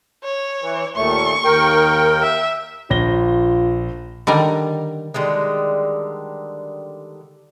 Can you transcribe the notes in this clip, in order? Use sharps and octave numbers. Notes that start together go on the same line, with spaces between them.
C#5
E3
D#2 A#2 A3 C#6
D#2 A#4 G5
E5
A#1 F4 A#6 G7
D3 D#3 G3 A#4
D3 D#3 G3 G#3